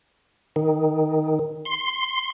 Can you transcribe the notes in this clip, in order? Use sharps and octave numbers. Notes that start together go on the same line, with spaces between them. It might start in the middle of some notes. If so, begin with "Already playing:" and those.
D#3
C6